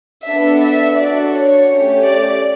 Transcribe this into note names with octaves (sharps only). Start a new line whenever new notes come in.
B3 D4 A4 E5
E5
D4 F#4 A4 D5
C#5
A3 C#4 G4
D5